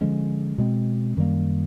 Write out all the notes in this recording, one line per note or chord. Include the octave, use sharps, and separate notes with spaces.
D3 F3 G#3 C#4
B2 G#3 C4
F#2 D#3 G3 A#3